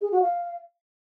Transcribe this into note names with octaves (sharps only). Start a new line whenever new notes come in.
G#4
F#4
F5